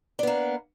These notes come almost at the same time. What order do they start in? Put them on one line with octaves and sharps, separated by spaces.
D4 B3 A#3